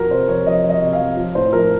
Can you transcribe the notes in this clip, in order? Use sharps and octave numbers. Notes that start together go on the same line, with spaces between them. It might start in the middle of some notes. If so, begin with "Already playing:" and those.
Already playing: F2 F3 F#4 A#4
C3 C5
F2 C#5
F2 D#5
F3
D#5
C3
F5
F2
F3
A2 C5
F3 A#4